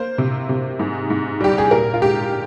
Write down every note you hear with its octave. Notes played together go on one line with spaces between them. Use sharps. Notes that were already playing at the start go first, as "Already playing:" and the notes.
Already playing: A#3 C5
C3
C3
G#2
G#2
G3 G4
G#4
A#2 A#4
F4
G#3 G4